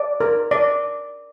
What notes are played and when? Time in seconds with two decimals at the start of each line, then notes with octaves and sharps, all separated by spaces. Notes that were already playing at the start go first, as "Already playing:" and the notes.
Already playing: D5
0.20 A#4
0.51 D5